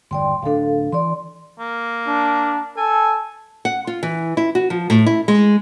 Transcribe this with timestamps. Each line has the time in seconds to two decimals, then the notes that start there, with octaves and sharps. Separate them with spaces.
0.11 G1 E2 D5 G5 C6
0.42 D1 D4 A4 F5
0.92 E3 D5 C6
1.59 A#3
2.08 D4
2.77 A4 G#5
3.65 F#5
3.87 F4
4.03 E3
4.37 E4
4.55 F#4
4.70 F3
4.90 A2
5.06 E4
5.28 G#3